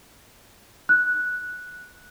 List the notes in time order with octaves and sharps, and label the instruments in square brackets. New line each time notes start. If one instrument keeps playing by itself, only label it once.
[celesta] F#6